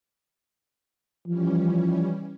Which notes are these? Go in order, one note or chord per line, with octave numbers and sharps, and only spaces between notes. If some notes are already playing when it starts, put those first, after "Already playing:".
E3 F3 G3 C#4